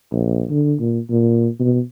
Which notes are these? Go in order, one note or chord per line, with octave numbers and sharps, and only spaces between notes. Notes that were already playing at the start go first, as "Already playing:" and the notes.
A#1
D3
A#2
A#2
B2